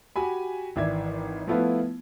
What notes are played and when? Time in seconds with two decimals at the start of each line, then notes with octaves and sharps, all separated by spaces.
0.16 F#4 G4 G#5 B5
0.76 G#1 E3 D5 E5 G#6
1.47 F3 A3 B3 E4 F4 B4